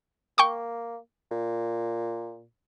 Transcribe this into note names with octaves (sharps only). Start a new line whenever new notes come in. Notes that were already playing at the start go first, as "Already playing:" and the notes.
A#3 G5 C#6 D6
A#2